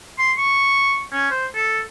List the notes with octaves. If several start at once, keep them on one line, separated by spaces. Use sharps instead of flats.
C6
C#6
C#4
C5
A4